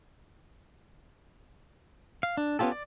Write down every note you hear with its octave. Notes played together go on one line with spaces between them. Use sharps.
F5
D4
B3 C#4 F4 G4 A4
D5